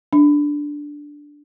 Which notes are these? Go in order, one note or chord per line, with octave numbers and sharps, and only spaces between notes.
D4